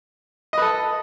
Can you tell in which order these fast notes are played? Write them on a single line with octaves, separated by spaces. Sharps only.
D#5 B4 A4